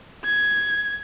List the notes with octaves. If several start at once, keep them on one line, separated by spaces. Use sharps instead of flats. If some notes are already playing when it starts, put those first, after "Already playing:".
G#6